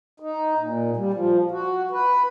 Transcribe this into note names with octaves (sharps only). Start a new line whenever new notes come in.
D#4
A#2
G3
F3
F#4
B4